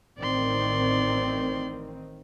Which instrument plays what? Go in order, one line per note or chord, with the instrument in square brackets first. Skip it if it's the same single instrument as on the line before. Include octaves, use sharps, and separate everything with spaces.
[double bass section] A1 D#3 C4 [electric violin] D5 C6